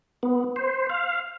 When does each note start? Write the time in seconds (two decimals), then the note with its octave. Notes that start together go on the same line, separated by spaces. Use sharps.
0.23 B3
0.56 C5
0.90 F5